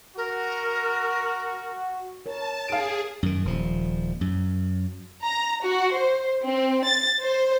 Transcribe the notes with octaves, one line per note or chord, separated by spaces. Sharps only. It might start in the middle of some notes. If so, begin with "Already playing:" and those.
F#4 A#4
A#4 C#5 A5
G#4 F5 D7
F#2 D#3
D#1 F3
F#2
A#5
F#4
C5
C4
A6
C5